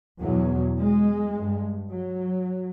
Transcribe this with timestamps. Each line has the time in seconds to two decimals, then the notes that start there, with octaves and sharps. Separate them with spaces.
0.20 E2 B2 F#3
0.77 G#3
1.34 G2
1.91 F#3